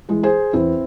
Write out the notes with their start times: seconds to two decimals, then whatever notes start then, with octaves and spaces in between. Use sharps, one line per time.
0.09 E3 G#3
0.23 G#4 C5
0.53 E2 C4 E4